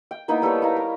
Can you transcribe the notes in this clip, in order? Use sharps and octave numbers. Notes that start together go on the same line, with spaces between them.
G5
A#3 B3 D#4 E4
G3 A4 B4 C#5
E4 F5 A#5
A#4